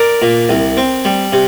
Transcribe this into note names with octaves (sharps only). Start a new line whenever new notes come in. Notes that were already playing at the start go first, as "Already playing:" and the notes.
Already playing: A#4 D5
A#2
C2
C4
G3
C3